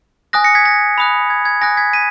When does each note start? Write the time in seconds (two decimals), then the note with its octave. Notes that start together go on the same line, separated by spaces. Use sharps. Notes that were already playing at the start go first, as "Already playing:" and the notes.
0.33 G#5 D#6 F#6 A#6
0.44 A#6 C#7
0.55 G#6 B6
0.65 A#6
0.98 B5 D#6 F#6
1.30 G#6
1.45 G#6
1.61 G#5 D#6 F#6 A#6
1.77 G#6 B6
1.93 B6 D#7